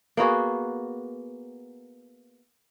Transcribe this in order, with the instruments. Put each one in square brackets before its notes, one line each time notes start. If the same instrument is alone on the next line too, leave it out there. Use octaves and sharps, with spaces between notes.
[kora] A#3 B3 F#4 G#4